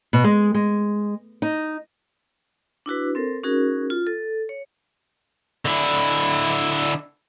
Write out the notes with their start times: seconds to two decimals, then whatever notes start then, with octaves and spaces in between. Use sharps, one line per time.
0.13 B2
0.24 G#3
0.54 G#3
1.42 D#4
2.86 D4 E4 F#4 B4
3.15 C4 A4 A#4 C5
3.44 C#4 D#4 F#4 G#4 A#4
3.90 F4
4.07 A4
4.49 C#5
5.65 D3 E4